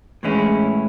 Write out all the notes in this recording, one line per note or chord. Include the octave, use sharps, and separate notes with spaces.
A2 E3 G#3 C#4 E4